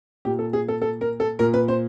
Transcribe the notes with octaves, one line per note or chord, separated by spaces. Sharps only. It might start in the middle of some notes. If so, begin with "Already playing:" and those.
A#2 G4
A4
G#4
A4
A4
A#4
A4
A#2 A#4
B4
C5